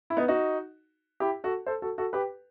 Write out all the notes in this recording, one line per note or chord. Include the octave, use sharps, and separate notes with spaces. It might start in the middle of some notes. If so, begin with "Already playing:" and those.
E4
B3 D#4
D#4 F#4
E4 G4
F#4 A4
A4 C5
F#4 A4
F#4 A4
G4 B4